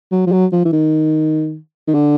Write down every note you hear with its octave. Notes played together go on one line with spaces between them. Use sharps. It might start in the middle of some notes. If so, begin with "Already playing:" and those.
F#3
F3
F#3
F3
E3
D#3
D#3
D3